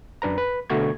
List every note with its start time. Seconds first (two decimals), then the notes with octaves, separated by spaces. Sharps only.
0.22 F#2 D4 B4 A#5
0.38 B4
0.70 B2 D3 A3 F#4 C#6 G#6